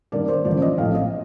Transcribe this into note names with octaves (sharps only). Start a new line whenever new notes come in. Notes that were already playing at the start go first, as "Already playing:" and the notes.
G2 D#3 A#3 D5
C5
A1 G2 D3 F3 D5
D#5
A#1 A2 A3 C4 F5
D#5